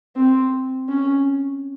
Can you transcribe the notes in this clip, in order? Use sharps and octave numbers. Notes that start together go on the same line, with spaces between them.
C4
C#4